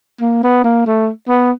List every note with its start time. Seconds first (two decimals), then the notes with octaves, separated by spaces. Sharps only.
0.21 A#3
0.43 B3
0.64 A#3
0.86 A3
1.29 B3